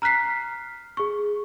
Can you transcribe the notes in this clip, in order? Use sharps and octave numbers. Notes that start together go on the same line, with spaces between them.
A#5 F6 F#6 B6 C7
G#4 C#6